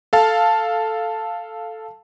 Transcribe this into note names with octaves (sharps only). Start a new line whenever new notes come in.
A4 F5 A5